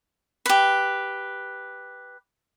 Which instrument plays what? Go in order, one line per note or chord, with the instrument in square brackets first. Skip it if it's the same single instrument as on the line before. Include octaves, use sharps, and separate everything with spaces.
[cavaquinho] G4 B4